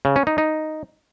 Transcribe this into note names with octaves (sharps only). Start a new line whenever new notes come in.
C#3
C#4
D#4
D#4